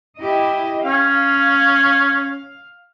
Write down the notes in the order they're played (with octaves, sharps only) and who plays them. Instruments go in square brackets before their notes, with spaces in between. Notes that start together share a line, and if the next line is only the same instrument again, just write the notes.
[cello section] E4 G4 D#5
[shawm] C#4 [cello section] F5